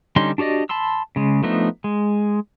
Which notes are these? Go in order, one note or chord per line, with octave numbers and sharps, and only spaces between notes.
D3 G3 C#4 D#4 C6
D4 F#4 G4 D5 D#5
A5 B5 C6 E6
C#3 G#3
F3 A3 B3 D4 D#4
G#3